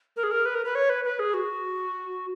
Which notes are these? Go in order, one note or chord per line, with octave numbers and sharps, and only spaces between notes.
A#4
G#4
A#4
B4
A#4
B4
C#5
B4
B4
G#4
F#4